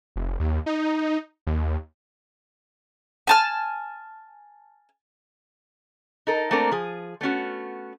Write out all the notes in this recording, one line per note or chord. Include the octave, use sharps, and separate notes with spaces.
F1
D#2
D#4
D#2
G#5 A5 F6
D#4 A4 A#4
A3 A#3 C4 D4 A#4
F3 G#4
A3 B3 C#4 F#4